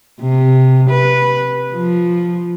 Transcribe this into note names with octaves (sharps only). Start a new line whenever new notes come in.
C3
B4
F3